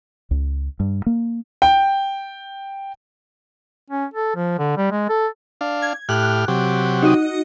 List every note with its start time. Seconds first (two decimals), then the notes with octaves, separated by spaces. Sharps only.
0.31 C#2
0.80 G2
1.06 A#3
1.62 G5
3.90 C#4
4.14 A4
4.36 F3
4.59 D3
4.77 G3
4.92 G#3
5.09 A4
5.61 D4 F5
5.82 G#6
6.09 A2 G4 F6 F#6
6.48 C3 F#3 G4
7.02 D#4 F#4 D#5